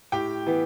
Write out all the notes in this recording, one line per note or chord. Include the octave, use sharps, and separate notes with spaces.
A2 G4 G5
E3 B3